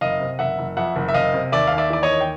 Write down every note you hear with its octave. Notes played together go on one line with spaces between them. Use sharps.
F#1 D#5 F5
C3
F#1 E5 F#5
F#1
F2 E5 F#5
F#1
E5
F#1 D#5 F5
C3
D#2 D5 E5
D#2 F5
D5 E5
E3 D5
C#5 D#5
D#2
G5